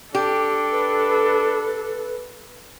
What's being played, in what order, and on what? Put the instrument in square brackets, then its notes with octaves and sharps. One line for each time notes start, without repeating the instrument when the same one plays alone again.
[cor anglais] D4 [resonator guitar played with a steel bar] G4 [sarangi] A4
[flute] B4